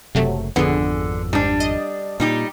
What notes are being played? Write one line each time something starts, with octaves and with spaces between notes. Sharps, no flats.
F#1 C3 F#3 A3
G#1 F2 D3 F3 B3 G#4
G#2 G3 D4
D#5
A#2 G3 D#4 G4